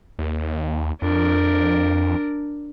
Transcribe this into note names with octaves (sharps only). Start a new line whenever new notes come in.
D#2
F2 D4 A#4